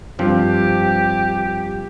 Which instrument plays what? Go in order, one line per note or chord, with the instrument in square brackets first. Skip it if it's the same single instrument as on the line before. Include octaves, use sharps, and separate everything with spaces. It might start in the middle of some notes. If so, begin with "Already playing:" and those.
[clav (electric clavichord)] G2 F3 C4 [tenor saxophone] G4